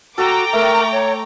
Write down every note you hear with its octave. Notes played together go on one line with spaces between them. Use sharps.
F#4 A4 G5 A#5 D6
A3 A#4
C#5